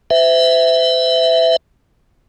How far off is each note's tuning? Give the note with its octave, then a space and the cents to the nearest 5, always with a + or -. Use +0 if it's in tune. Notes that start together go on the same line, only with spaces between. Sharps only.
C5 -45 E5 +0